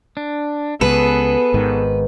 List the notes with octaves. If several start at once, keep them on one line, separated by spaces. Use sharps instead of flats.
D4
C#2 B3 G#4 A4 B4
G#1 G#2 D#3